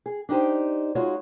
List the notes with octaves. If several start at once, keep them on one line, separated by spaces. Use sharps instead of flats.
G#4
D4 D#4 G4 C5
G#3 D#4 F4 F#4 C#5